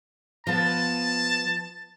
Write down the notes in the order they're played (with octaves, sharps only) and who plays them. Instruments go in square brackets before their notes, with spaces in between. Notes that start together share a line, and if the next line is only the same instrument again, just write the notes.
[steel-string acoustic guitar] F3 B3 B4 [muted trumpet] A5